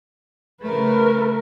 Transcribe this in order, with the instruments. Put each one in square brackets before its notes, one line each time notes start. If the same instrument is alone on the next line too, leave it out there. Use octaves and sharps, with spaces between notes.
[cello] C#3 A3 [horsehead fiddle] A#4 B4